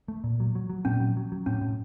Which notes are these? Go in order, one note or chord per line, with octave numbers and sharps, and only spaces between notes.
A3
A#2
F#3
F#3
F#3
A#2 C#4
F#3
F#3
F#3
A2 C#4
A2